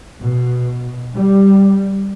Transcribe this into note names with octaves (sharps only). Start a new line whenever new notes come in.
B2
G3